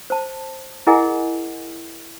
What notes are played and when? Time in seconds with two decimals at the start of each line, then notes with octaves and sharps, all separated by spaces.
0.10 C5 A5
0.87 E4 G#4 A#4 D#5 F#5 G#5